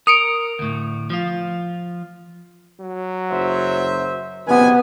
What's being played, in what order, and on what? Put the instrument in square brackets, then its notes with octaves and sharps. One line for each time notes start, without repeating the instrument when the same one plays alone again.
[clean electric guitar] A#4 [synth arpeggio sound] D#6 C#7 D7
[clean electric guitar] D2 A2
F3 F4
[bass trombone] F#3
[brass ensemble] F#1 C5 E5
[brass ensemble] F#1 D#3 G#5 [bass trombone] C3 [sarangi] B3